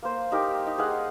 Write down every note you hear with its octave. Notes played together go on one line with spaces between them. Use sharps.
A#3 C5
D#4 G4 A#4
D#4
G#4 D#5 F5 F#5